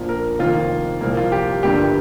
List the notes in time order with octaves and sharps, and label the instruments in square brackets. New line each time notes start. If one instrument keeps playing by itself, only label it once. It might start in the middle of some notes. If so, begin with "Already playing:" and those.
Already playing: [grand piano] A#1 A#2 F3 A#3
A#4
F1 F2 D#3 A#3 F4
C2 A#2 F3 A#3
F4
G4
G1 G2 G3 A#3 G4